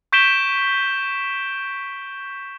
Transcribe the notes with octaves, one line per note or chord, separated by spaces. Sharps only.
C#6 G6 B6 D7 E7 G7